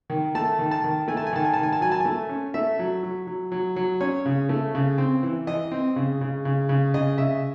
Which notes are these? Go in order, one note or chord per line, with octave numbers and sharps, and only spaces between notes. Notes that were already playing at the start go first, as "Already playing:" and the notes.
D#3
A3 A5
D#3
A5
D#3
A3 G#5
A5
G#5
D#3 A5
G#5
D#3 A5
G#5
A5
F#3 G#5
A5
A3 G#5
C#4
A3 E5
F#3
F#3
F#3
F#3
F#3
C#4 C#5
C#3
A3
C#3
C4
E3
E3 D#5
C4
C#3
C#3
C#3
C#3
C#3 D#5
C#3 E5